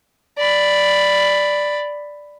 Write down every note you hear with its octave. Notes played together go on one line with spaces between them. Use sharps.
D5 B5